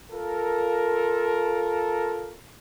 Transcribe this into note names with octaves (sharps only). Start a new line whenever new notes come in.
F4 A4 A#4